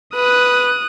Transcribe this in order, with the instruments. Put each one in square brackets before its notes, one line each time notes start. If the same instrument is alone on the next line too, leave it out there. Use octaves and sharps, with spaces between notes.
[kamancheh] B4 [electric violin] D#6 F#6